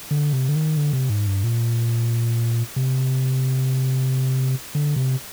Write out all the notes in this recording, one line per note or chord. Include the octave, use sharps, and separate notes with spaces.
D3
C3
D3
D#3
D3
C3
G#2
G2
A#2
C3
D3
C3